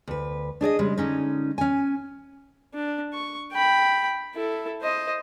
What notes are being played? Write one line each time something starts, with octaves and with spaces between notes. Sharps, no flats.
D2 B4
D4 G#4 D5 D#5
C#3 G3 G#3
D3 G#3 C#4 D#4
C#4 G#5
D4
C#6
G5 B5
E4 A4
C5 D#5